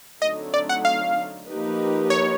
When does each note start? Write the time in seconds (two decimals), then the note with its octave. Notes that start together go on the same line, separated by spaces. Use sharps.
0.22 D3 F#3 A3 C4 D#4 D#5
0.54 D5
0.69 F#5
0.85 F5
1.47 F3 A#3 D#4 G4 B4
2.10 C#5